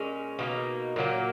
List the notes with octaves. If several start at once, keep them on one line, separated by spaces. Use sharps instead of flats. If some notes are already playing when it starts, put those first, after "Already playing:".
Already playing: A#2 G#3 C#4
B2 A#3 D#4
A#2 F#3 A#3